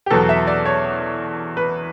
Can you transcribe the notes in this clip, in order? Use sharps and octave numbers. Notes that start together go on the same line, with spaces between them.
G4
E2 B2 F#3 A4
E5
D5
C#5
B4